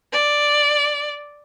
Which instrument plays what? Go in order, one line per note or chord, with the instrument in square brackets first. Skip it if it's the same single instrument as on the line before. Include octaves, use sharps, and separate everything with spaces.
[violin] D5